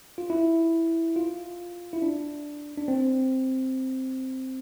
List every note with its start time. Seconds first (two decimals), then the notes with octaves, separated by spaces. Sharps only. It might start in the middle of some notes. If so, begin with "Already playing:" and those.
0.18 F4
0.30 E4
1.16 F4
1.93 E4
2.02 D4
2.77 D4
2.88 C4